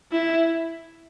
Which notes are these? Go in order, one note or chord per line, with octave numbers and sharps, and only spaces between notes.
E4